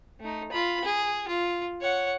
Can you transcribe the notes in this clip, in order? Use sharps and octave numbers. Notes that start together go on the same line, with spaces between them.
A3 D#4
F4 B5
G#4
F4
C#5 F#5